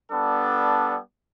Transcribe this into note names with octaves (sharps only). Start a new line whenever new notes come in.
G3 B3 D4 A4